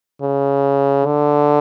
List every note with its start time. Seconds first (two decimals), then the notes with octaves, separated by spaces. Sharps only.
0.22 C#3
1.06 D3